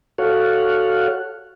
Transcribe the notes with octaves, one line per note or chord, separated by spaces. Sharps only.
F#4 A4 C#5 F5 F#5